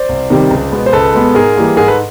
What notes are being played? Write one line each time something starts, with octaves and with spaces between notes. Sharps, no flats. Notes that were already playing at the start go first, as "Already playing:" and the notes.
Already playing: C5 D5
C2
C3 D#3 G3
C#2
B2 G#3 B3
C5
C#2 A4 B4
B2 G#3 B3
G#2 G#4 A#4
E3 G3 A#3
G#2 G#4 A#4
A4 B4